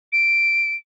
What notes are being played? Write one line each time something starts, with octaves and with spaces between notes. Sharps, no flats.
D7